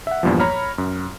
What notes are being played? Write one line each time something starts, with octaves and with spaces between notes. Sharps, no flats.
E5 F#5
E2 G2 A#2 F3
C#5 A#5 B5 F6
F#2